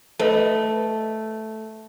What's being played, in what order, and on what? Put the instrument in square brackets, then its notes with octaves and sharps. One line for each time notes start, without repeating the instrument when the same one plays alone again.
[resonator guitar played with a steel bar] A3 [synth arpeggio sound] A4 B4 D#5